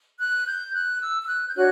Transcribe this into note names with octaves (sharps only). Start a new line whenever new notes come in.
F#6
G6
F#6
E6
E6
F#6
G6
D4 F#4 C#5 F#6